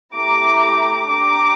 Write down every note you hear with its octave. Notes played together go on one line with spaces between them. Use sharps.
A3 E4 G4 A#5 D6
D4 G4 A#5 D6